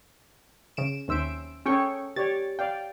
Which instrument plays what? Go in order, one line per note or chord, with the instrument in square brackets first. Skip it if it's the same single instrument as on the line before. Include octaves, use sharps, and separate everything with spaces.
[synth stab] C#3 D7 E7
[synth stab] D#2 E6 D7 [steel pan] C#4 C5 E5
[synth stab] C#4 G5 C#6 [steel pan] G#4 A4 C#5
[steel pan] G4 C#5 D5 [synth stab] A6
[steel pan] D5 F5 [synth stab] G5